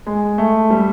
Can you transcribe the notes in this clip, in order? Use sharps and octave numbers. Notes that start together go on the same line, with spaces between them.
G#3
A3
G3